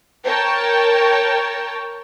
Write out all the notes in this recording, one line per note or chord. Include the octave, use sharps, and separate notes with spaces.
A#4 C#5 G5 A5